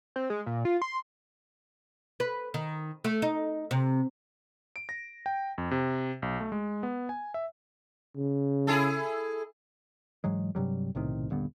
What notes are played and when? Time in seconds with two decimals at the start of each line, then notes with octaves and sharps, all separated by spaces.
0.16 C4
0.30 G#3
0.46 A#2
0.65 F4
0.82 C6
2.20 B4
2.54 D#3
3.04 A3
3.22 D#4
3.71 C3
4.76 D7
4.89 A#6
5.26 G5
5.58 F2
5.71 C3
6.22 B1
6.40 A3
6.52 G#3
6.83 B3
7.09 G#5
7.34 E5
8.16 C#3
8.67 E4 G#4 A4
10.24 G#2 E3 F#3 G#3
10.55 G2 C3 F#3 G3
10.95 B1 A2 C3 D#3
11.30 D#1 G2 D3 B3